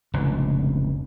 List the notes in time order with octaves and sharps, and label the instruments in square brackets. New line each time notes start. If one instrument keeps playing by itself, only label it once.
[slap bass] F1 C#2 D3